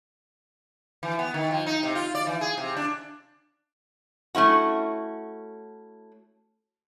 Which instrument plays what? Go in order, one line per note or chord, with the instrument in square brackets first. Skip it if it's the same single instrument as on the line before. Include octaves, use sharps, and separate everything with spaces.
[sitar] E3
B3
D#3
F3
D#4
C3
F4
D5
E3
G#4
C3
D4
[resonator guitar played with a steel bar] A3 C#4 E4 F#4